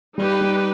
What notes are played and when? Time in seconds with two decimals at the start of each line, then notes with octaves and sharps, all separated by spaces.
0.17 G3 D#4 G4 B4
0.41 G3